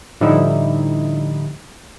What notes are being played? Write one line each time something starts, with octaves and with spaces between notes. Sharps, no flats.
A2 D3 F3 G3 D#4 E4